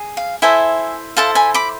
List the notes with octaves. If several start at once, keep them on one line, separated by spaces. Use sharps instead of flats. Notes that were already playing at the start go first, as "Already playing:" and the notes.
Already playing: G#4
F5
E4 A4 C5 E5 G#5
E4 A4 C5 F5 A5
G#5 B5
B5 D6